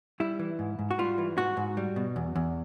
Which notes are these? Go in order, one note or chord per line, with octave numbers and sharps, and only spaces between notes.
G3 E4
E3
G#2
G#2
F#4
G3 F4
E3
G#2 F#4
G#2
G3
B2
E2
E2